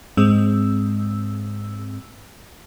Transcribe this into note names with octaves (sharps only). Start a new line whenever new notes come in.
G#2 G#3 C4 E6